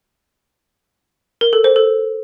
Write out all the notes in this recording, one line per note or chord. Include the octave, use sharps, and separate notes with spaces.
A#4
A4
C5
A4